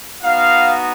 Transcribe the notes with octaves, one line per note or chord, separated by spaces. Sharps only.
B3 D#4 F#4 F5